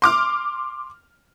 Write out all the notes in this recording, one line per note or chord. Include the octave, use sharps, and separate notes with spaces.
C6 D6 F6